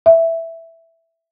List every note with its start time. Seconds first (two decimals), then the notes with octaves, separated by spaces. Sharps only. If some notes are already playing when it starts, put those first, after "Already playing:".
0.06 E5